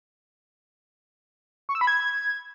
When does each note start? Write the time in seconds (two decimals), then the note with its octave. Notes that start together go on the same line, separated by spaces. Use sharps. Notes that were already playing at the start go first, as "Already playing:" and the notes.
1.69 C#6
1.75 E6
1.81 B5
1.87 G#6